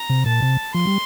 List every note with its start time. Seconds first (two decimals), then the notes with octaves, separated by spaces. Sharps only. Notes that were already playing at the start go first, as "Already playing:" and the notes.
Already playing: A#5
0.10 C3
0.26 A#2 A5
0.42 C3
0.74 F3 C6
0.87 G3